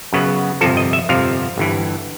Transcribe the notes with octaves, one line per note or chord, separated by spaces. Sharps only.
F#2 C#3 F#3 B3
G1 F2 C3 F3 A4
D#5
E5
G1 F2 C3 F3 F5
G1 G2 E3